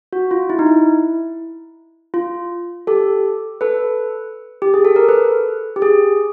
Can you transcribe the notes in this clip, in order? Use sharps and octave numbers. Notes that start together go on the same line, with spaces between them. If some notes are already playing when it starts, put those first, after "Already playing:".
F#4
F4
E4
D#4
E4
F4
G4 A4
A4 B4
G4
G#4
A4
A#4
A4 B4
G4
G#4